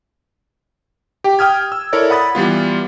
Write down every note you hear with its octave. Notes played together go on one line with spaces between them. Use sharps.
G4 G5
G5 D#6 F6 G#6
E6
E4 A4 A#4 C#5 D5
F#5 B5 D#6 A6
E3 G3 B3 F4